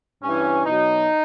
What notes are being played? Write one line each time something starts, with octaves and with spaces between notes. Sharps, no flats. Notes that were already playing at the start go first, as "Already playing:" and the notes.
G2 E3 C#4
B2 F#3 D#4